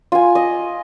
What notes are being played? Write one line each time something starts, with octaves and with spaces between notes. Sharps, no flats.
F4 G#5
D#5